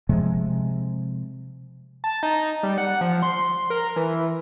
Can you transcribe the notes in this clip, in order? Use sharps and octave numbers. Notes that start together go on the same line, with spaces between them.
C3 F3 G#3
A5
D#4
G3
F#5
F3
C6
A#4
E3